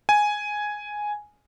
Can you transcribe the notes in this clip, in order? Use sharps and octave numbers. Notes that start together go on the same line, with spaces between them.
G#5